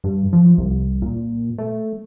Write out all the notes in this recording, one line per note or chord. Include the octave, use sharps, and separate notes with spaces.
G2
F3
C2
A#2
A3